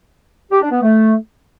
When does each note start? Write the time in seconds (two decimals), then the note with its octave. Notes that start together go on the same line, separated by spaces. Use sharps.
0.51 G4
0.61 D4
0.71 B3
0.82 A3